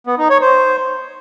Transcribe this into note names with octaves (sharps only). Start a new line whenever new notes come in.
B3
D#4
C#5
C5